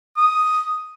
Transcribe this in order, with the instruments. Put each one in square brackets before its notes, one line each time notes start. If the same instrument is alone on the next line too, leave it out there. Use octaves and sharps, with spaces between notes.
[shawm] D#6